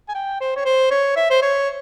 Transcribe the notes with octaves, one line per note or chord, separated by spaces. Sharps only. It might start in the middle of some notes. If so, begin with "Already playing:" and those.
G#5
G5
C5
C#5
C5
C#5
E5
C5
C#5